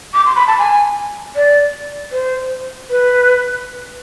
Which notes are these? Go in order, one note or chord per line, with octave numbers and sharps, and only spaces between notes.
D6
C6
B5
A5
G#5
D5
C5
B4